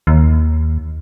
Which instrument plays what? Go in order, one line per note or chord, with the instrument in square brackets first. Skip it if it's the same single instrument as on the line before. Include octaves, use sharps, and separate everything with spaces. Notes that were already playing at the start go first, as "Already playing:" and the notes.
[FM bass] D#2